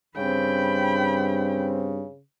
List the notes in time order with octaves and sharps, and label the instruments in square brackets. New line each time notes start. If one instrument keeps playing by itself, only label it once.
[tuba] G2 [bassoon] C#3 [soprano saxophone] C4 [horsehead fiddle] G5 B5